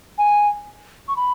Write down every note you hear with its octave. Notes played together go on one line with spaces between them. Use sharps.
G#5
C#6
B5